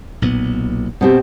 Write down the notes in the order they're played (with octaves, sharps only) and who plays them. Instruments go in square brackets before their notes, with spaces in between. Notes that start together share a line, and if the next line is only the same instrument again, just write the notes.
[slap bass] B1 A#2 B3
[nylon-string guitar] B2 C4 G4